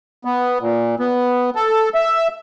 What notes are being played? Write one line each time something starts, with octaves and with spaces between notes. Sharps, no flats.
B3
A#2
B3
A4
E5